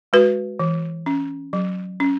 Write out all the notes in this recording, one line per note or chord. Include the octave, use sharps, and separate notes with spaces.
G#3 F#4 B4
E3
C#4
F#3
C#4